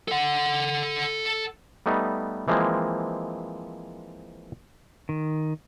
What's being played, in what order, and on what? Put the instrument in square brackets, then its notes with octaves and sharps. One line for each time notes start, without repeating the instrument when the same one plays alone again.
[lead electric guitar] A4 F#5
[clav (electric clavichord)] G3 A3 B3 D#4
E3 F3 G#3 A#3 C4
[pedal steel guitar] D#3